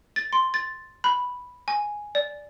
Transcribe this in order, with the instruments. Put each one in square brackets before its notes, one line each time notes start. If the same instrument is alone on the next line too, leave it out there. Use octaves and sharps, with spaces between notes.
[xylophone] A6
C6
A6
B5
G#5
D5